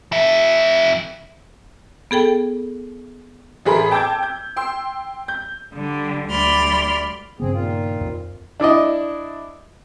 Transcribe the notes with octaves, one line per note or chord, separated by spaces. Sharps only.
F2 E5
B3 G#4 A4 G5
A1 A3 G#4 A#4 B5 C6
G5 A5 D6 E6 G6 G#6
G6
G5 C6 E6
G6
D3 G3
D2 G3 D5 B5 C6 F6
G2 C#3 B3 C4 G#4
A#2 D#3 F4
F2
D4 E4 D5 D#5